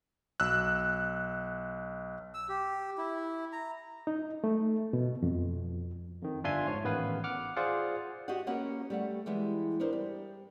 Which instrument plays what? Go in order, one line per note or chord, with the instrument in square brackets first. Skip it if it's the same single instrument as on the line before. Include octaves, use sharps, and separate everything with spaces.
[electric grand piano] B1 E6 F#6
[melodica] E6
G4
E4
A#5
[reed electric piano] D#4
A3
B2
F2
[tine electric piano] F2 D#3
G1 D4 F4 E5 G#5 C6
G#2 C#5
A1 D#3 B3 B4 F5
F#5 D6 F6
F4 G#4 C5 D5 F5 F#5
[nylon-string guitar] F#4 G4 D#5 F5 F#5
A#3 B3 C#4 F#4 F#5
G3 A3 F#5
E3 G3 G#3 B3
B3 D4 A#4 C5
G3